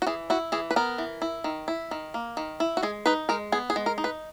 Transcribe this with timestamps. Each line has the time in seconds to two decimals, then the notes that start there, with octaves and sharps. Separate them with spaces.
0.02 F#4
0.07 E3 G#4
0.30 E4 F#4
0.52 E3 G#4
0.71 B4
0.76 B3 A#4
0.98 E3
1.22 E4
1.44 D#3
1.68 E4
1.91 D#3
2.14 A#3
2.37 D#3
2.60 E4
2.77 F#4
2.83 G#3 G#4
3.06 D#4 B4
3.29 G#3 A#4
3.52 B3 G#4
3.70 G#4
3.76 G#3
3.86 A#4
3.98 D#4
4.04 B4